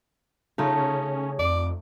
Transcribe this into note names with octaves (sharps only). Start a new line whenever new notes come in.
C#3 A3 C#4 D#4 F4 G#4 C#5
F2 D5 D6